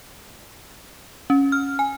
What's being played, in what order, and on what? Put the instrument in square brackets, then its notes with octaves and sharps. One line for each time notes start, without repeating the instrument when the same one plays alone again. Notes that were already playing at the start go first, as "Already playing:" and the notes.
[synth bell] C#4
F6
G#5